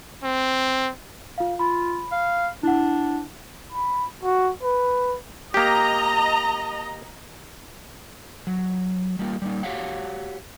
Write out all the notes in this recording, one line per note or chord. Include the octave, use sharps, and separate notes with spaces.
C4
F4 F5
F4 B5
F5
D4 E4 F#5
B5
F#4
B4
A#3 G4 D#5 A#5
F#3
G3 A#3 F4
G3 A#3 D#4
F#4 G4 C#5 F5 F#5